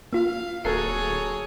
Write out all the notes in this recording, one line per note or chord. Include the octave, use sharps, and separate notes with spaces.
A#3 F4 F5
D1 A#3 F#4 G#4 A4 C#5 C7